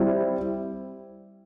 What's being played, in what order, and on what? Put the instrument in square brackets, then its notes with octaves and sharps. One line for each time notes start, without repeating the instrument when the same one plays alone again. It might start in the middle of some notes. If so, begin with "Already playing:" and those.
Already playing: [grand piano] G3 C4 E4